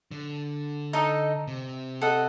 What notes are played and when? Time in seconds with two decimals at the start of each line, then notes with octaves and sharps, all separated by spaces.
0.11 D3
0.93 D#4 A4 D#5
1.47 C3
2.01 A4 D#5 F#5